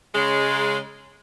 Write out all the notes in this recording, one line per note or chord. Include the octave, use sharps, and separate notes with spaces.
C#3 G#3